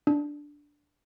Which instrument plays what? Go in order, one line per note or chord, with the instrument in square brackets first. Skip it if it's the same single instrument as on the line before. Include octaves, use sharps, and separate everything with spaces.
[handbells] D4